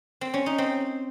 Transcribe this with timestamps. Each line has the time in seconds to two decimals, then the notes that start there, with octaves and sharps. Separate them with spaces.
0.21 C4
0.34 C#4
0.46 D#4
0.58 C4